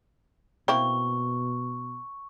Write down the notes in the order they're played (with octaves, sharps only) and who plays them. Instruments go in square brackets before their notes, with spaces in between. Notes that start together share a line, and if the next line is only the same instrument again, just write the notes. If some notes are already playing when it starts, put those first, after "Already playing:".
[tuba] B2 [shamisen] A#3 C4 E4 [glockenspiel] C#6